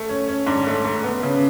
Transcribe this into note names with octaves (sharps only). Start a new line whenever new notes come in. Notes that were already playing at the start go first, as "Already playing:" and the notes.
Already playing: A3
C#4
C#4
G#2 D4
A3
A3
B3
C#3